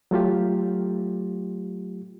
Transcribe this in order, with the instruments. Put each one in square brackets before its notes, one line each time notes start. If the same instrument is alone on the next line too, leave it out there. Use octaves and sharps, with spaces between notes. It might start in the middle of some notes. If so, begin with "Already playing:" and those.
[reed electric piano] F#3 A3 F4 G4